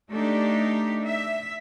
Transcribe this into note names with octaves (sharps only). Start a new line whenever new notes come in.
A3 D4 D#4 G4
E5